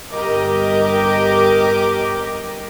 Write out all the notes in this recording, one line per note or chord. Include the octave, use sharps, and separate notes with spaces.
G1 G4 A#4 D#5 D6